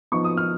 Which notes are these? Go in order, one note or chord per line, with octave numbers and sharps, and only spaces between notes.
F3 B3 D#4 C#6
D#6
F6